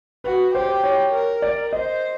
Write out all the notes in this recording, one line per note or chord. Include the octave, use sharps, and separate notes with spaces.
F#4 B4
G4 C5
C5
C#5
A#4
D5
C5 D#5